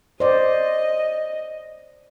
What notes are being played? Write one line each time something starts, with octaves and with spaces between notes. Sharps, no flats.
C5 D5 D#5